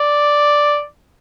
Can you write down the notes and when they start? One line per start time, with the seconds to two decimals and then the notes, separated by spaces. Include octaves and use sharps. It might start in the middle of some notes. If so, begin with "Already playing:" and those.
Already playing: D5